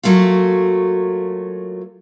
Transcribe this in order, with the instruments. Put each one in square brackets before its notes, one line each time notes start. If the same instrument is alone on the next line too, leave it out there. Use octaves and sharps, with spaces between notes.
[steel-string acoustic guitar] F#3 A3 A#3 F4